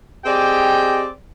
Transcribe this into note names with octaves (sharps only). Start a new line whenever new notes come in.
C4 G4 G#4 D5 D#5 G5